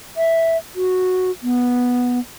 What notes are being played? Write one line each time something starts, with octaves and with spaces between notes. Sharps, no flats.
E5
F#4
B3